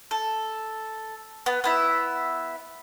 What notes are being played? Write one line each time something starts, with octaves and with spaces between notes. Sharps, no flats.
A4
B3
B3 E4 E5